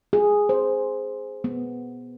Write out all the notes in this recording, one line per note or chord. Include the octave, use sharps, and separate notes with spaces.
G#4
C5
B3